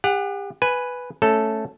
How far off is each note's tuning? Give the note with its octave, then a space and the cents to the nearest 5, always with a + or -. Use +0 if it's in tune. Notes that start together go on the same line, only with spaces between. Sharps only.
G4 +40 F#5 +0
B4 +0 G#5 +0
A3 +0 C#4 +0 A4 +0